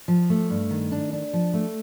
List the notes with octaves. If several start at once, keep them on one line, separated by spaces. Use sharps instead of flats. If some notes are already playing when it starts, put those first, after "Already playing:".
F3
A3
G2
D#3
D4
D4
F3
A3